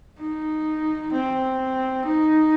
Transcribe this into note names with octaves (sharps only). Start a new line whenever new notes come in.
D#4
C4
D#4